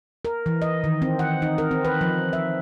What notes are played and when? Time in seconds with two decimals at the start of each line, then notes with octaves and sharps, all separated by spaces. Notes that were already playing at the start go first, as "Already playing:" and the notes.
0.25 A#4
0.46 E3
0.62 D#5
0.84 D#3
1.02 C4
1.19 F#5
1.42 D#4
1.58 A#4
1.71 C4
1.85 B4
2.01 F3
2.33 E5